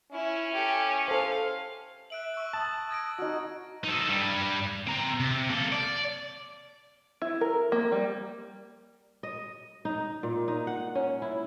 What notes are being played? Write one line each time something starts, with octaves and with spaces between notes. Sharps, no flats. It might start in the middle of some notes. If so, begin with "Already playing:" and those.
C#4 E4
G4 A4
A4 C5 F5
E5 F#6 D7 F#7
C#6 E6
A5 D#6
G#6 A#6 D7
D#4 F#4 F6
D#4 A4
G2 G3
C4 A#5
C3
A#3 A4
D5
E4
A#4
A#3
G3
D#5
D#4
A#2
D#4
F#5
C#4
E4